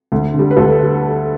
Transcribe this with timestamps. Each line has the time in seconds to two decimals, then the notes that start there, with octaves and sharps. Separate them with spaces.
0.12 D2
0.34 D3
0.39 G3
0.51 B4
0.57 D2 A4